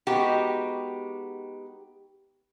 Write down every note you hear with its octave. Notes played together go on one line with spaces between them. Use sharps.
G#3 B3 D#4 F#4 G4